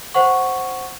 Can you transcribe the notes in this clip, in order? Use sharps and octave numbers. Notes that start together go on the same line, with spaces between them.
C5 F#5 C#6